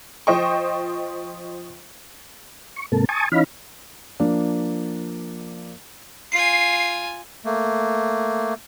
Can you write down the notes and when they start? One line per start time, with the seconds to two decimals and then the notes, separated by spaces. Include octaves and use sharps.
0.27 F3 C5 D#5 G5 C#6
2.76 C#6
2.92 G#2 C3 A#3 A4
3.09 G#5 A5 C#6 D#6
3.32 E3 C#4 D#4 F5 B5
4.20 F3 A#3 D4
6.32 F4 G#5 C7
7.45 A3 A#3